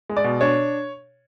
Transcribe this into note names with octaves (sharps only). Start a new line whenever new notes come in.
G#3
D5
B2
D4 C#5